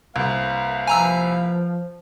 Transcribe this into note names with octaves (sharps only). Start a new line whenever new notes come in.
C2 A#3 B4 F5
F3 G#5 A#5 E6